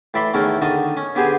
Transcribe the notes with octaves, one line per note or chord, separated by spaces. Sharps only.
A2 E3 D5 E5 B5 C6
E2 D#3 A3 C#4 A4 A#4
D3 D#3 D#5 A5 C#6 D#6
C#4
D3 B3 G4 G#4 C5 G#5